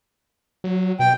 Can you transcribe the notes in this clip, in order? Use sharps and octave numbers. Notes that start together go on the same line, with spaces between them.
F#3
B2 G5